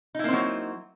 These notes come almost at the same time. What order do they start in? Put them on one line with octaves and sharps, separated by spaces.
D#4 E4 A#3 C4 F#3